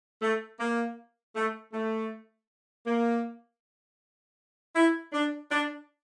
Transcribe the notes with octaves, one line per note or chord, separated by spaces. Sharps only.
A3
A#3
A3
A3
A#3
E4
D4
D4